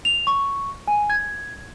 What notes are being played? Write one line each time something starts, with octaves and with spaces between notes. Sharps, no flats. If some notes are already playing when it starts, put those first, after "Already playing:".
F7
C#6
G#5
G#6